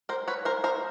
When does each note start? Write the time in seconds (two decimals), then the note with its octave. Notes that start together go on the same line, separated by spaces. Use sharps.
0.09 A#4 C5
0.28 B4 C#5
0.45 A#4 C5
0.64 A#4 C5